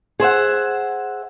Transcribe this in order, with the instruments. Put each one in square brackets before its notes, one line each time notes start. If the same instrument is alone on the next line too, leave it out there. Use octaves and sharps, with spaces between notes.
[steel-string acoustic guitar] G#4 C5 E5 F#5